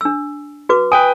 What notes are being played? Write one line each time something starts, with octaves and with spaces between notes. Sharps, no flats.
D4 E6
F#4 B4 D6
B4 G5 G#5 D#6